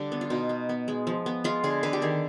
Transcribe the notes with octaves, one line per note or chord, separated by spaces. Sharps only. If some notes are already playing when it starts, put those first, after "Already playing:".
Already playing: D3 G3 D4
B3
F4
B2 D#4
B3
B3
G#3
F3
B3
G#3 F4
D3 G#4
D3 B4
G4
D#3 G#4